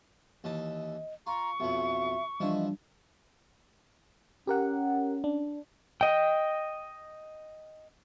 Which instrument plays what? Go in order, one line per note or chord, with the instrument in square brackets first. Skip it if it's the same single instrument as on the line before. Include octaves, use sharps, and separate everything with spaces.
[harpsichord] D#2 E3 A5 [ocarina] D#5
[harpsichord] F4 [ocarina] A#5 [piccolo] C#6
[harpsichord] B1 F2 B3 [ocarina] E5
[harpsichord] E3 F3 E4 [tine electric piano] G3 D4 [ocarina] D#5
[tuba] C#4 [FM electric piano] G4 A#4 F#5
[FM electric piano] D4
[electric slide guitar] D#5 G5